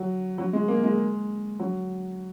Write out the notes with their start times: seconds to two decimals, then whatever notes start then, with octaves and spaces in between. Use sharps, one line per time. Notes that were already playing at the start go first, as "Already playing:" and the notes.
Already playing: F#3
0.38 F#3
0.53 G#3
0.68 A#3
0.83 G#3
1.59 F#3